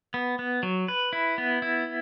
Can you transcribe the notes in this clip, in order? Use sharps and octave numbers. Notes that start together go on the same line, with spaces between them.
B3
B3
F#3
B4
E4
B3
E4